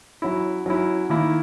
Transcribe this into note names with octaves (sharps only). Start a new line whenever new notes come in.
F#3 C#4 E4
F#3 C#4 E4
D#3 A#3 E4